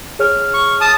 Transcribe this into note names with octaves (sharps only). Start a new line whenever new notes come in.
G#4 C#5 F6
C#6
A5 D#6